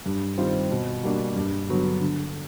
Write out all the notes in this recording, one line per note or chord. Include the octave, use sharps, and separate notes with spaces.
G2
D#3 G3 C4 F4
B2
G3 A#3 D4 F#4
G2
D3 F#3 B3
D3